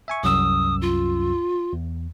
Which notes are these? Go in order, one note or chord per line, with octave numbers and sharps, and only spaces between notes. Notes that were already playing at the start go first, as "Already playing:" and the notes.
E5 G#5 C#6
C2 F#2 D#6 E6
F4
E2